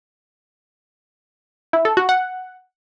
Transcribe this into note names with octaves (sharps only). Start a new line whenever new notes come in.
E4
A4
F#4
F#5